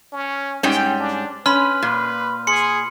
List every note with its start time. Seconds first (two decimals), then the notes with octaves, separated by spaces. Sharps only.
0.13 C#4
0.63 G#2 G3 C#4 G5
1.00 D4
1.46 C#4 B4 B5 C6 F6
1.82 A#2
2.47 G#4 C6 C#7